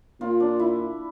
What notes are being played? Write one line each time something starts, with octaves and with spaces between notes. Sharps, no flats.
A#2 F4
D4
E4